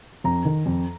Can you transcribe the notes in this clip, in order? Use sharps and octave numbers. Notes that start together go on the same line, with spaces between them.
F2 A#5
D#3
F2